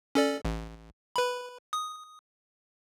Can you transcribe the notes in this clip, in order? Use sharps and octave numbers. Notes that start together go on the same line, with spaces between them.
C#4 A4 D5
A1
B4 B5
D#6